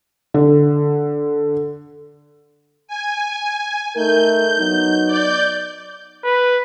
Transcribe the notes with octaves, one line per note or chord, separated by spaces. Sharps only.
D3
G#5
A3 D#4 A#4 G6
F#3 B3 D#4
D5 G6
B4